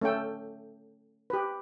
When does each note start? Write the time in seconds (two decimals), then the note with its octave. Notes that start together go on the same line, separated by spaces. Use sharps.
0.01 A3 C#4 A4 G5
1.30 G4 B4